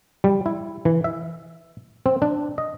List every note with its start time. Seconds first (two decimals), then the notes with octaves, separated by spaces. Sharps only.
0.24 G3
0.46 E4
0.85 E3
1.04 E5
2.06 C4
2.22 D4
2.58 D#5